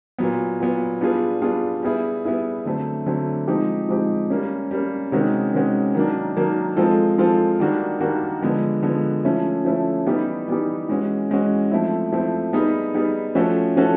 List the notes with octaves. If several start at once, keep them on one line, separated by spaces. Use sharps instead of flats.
A#2 F#3 B3
A#2 F#3 B3
G3 B3 D4 F4 G#4
G3 B3 D4 F4 G#4
G3 B3 E4 G#4
G3 B3 E4 G#4
D3 F#3 A3 C4
D3 F#3 A3 C4
F3 G#3 C4 D#4 G4
F3 G#3 C4 D#4 G4
G3 A#3 C#4
G3 A#3 C#4
C3 D#3 G#3 C#4 F#4
C3 D#3 G#3 C#4 F#4
D#3 F#3 A#3 D4
D#3 F#3 A#3 D4
F3 G#3 C4 F4 A4
F3 G#3 C4 F4 A4
D#3 G3 A#3 D4 F#4
D#3 G3 A#3 D4 F#4
D3 F3 G#3 B3
D3 F3 G#3 B3
F3 A3 C#4 E4
F3 A3 C#4 E4
E3 G3 B3 D#4 G4
E3 G3 B3 D#4 G4
E3 G#3 C#4 F#4
E3 G#3 C#4 F#4
F3 A3 C4 E4
F3 A3 C4 E4
G3 B3 D#4 G#4
G3 B3 D#4 G#4
F3 A3 C#4 F#4 A4
F3 A3 C#4 F#4 A4